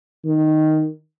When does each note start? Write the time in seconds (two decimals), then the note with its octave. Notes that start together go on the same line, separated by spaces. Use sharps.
0.25 D#3